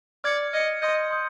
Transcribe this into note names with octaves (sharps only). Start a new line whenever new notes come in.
D5 F6 G#6 C#7
D#5 F6 G#6 C#7
D#5 C6 D#6 G6
C6 D#6 G6